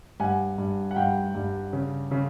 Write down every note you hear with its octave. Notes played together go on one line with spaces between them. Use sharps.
G2 F#5 G#5
G2
F#5
G2 F5 G5
G2
C#3
C#3